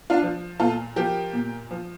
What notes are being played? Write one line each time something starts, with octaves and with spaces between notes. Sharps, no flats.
D4 F4
F3
A#2 F4 A4
F3 G4 A#4
A#2
F3